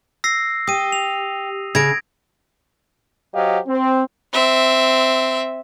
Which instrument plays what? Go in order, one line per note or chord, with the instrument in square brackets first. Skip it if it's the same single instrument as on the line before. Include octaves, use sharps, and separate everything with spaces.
[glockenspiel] E6 A#6 C7
[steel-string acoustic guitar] G4 [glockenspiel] D#6 D#7
[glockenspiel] F7
[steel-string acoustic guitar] C#3 [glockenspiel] G#6 A#6 D7
[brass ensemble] F#3 G4 C5 D#5 F5
C4
[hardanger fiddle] C4 E5